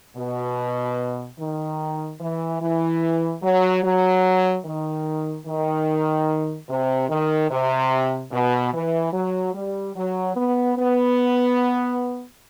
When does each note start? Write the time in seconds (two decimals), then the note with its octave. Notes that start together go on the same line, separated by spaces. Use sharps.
0.17 B2
1.38 D#3
2.20 E3
2.61 E3
3.43 F#3
3.83 F#3
4.65 D#3
5.47 D#3
6.69 C3
7.09 D#3
7.50 C3
8.32 B2
8.73 E3
9.13 F#3
9.54 G3
9.95 F#3
10.36 B3
10.77 B3